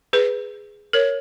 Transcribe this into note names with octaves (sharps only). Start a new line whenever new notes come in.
G#4 B4
A#4 C#5